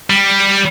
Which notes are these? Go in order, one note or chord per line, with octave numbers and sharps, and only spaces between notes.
G3